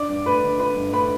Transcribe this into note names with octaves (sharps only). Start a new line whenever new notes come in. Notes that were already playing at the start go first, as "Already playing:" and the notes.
Already playing: D4 D5 D6
G2
A3 B4 B5
D3
D4 B4 B5
G2
A3 B4 B5